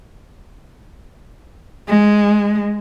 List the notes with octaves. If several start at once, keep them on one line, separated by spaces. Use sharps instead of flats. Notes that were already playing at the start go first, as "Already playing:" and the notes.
G#3